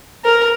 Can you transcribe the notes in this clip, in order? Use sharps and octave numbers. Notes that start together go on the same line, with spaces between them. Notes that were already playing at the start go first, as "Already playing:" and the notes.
A#4